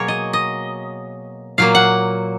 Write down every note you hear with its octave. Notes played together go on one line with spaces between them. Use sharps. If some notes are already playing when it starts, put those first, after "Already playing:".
Already playing: B2 F#3 A#3 G#4 A#4 C#5
D#5
D#5
A#2 F#3 A#3 F5
F#5